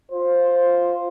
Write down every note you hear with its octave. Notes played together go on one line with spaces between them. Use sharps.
F4 C5